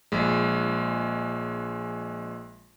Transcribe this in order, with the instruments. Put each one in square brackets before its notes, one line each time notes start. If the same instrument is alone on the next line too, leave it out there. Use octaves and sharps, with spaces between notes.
[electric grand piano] A#1 G#3